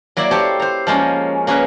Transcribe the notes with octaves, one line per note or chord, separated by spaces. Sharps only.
F#3 A#3 E4 D5
G4 A4 C5 C#5
C5 A#5
F3 G#3 A#3 C#4
A#3 C#4 G#4 A#4 B4